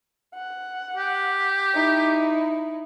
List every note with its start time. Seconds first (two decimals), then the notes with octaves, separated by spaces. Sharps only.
0.35 F#5
0.96 G4
1.74 D#4 E4